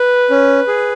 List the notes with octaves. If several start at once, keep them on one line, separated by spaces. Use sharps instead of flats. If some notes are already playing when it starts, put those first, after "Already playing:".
Already playing: B4
C#4
G#4